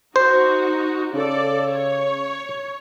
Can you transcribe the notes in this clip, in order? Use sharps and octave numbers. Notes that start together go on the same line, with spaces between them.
D#4 F#4 C5
C#3 A4 D5
C#5